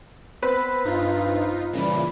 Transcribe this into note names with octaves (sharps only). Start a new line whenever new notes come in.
B3 C4 B4
G2 D#4 F4
A#2 C#3 E3 G3